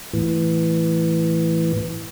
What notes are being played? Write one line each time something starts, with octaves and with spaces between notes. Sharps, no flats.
A2 E3